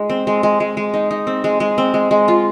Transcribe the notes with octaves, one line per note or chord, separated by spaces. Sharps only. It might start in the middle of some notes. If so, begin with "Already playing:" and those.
Already playing: G#3 D#4
C4
G#3
G#3
G#3
G#3
D#4
D#4
C4
G#3
G#3
C4
G#3
G#3
F4